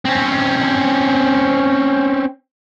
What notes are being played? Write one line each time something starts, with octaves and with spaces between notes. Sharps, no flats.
C4 C#4